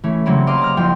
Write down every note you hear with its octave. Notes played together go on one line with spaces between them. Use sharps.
E3 A3 C#4
C#3 F#3 G3 A#3 C4 G#4
A#3 D#5 F5 C6 D6
A#5 F6
F#1 F3 G5 C6